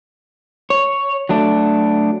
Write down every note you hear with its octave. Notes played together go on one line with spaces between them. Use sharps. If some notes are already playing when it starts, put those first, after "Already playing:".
C#5
F#3 A3 D4